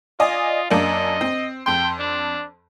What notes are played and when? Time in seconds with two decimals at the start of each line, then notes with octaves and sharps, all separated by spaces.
0.20 F4 D5 D#5 G#5
0.70 F#2 A#3 D4 D#5
1.21 C4
1.66 F2 G5 C6
1.99 D4